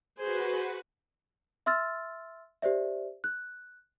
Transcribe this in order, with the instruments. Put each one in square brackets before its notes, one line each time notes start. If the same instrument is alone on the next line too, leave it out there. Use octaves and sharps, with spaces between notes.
[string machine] F#4 B4 [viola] G#4 C5
[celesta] E5 C6 E6 F6 A6
G4 C5 D5 E5
F#6